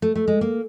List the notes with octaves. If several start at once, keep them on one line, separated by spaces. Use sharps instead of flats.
A3
A3
G#3
A#3